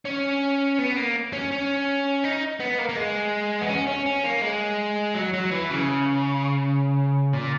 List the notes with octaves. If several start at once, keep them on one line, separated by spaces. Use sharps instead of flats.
C#4
B3
A#3
C#4
C#4
D#4
B3
A#3
A#3
G#3
B3
C#4
C#4
C#4
A#3
G#3
F#3
F#3
E3
C#3
A#2